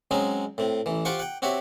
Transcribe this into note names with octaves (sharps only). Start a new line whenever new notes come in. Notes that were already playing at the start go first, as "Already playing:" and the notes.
F#3 G#3 C4 C#4 D#4 G#4
A2 C4
A1 E3
F4 G4 C5 F#5 G5 C#6
F#5 G5
C4 F#4 G4 C#5 E5 F#5